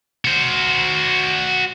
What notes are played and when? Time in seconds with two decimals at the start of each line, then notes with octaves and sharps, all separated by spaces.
0.25 F#4 C5